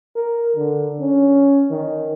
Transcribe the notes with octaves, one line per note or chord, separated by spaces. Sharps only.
A#4
D3
C#4
D#3